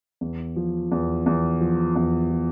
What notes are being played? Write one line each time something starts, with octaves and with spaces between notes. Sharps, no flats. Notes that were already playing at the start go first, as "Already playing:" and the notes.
E2
F3
E2
E2
F3
E2
F3